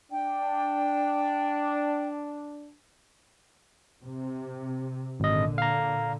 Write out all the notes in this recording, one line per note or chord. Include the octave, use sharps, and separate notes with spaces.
D4 G5
C3
G#1 A#2 D3 D#5
F5 A#5